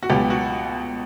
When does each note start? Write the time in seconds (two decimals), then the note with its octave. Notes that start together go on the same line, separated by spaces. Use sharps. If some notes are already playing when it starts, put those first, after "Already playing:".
0.03 F#4
0.09 C#2 B2 F#3 B3 G4
0.30 F#4